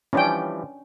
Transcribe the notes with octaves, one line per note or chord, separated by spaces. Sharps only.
E3 F3 G3 C#4 D4 G5